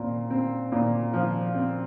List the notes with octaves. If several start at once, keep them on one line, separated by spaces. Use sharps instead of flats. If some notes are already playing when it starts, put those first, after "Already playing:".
Already playing: A#2 C4
C4
A#2
F3
C4